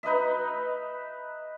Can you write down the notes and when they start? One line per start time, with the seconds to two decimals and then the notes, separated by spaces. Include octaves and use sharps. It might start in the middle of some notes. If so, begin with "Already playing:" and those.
0.03 D#4 B4 D#5 E5